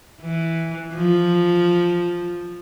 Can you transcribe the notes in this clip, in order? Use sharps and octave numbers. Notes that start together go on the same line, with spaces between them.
E3
F3